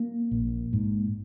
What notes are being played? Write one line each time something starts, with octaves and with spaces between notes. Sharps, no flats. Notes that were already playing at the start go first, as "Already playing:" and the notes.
Already playing: A#3
A#1
G#2